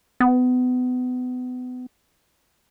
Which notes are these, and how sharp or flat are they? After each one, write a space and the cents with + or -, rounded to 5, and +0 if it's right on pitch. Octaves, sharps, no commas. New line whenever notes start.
B3 +30